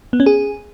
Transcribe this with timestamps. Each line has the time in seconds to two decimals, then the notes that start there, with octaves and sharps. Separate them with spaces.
0.13 B3
0.20 C#4
0.26 G#4